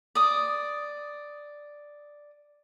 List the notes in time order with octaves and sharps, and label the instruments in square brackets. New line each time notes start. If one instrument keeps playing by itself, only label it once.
[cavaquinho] D5 D#6